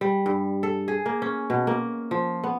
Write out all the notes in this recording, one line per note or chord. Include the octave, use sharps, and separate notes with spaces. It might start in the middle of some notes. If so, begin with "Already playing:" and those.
G3
G2
A4
G#4
A#3
C#4
B2
A#3
F3
B3